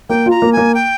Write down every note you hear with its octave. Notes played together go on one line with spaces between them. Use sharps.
A#3 G5
F4 A#5
A#3
A#3 G#5
G5